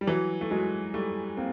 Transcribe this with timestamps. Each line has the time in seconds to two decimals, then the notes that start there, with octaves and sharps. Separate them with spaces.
0.01 G3
0.07 E3 F#3
0.41 A3
0.51 F#3 G#3
0.94 G3 A3
1.37 A#3 C4